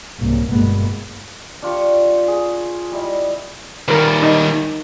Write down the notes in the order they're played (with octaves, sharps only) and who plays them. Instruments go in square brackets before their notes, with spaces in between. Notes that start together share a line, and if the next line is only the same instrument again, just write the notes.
[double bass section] C2 G#2 C#3 A#3
G1 G2 B2 G#3 A#3 B3
[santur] D4 F4 G4 C#6
G#4
G3 E4 D#5
[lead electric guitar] D#3 G3 [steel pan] A#4 B4
[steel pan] D#4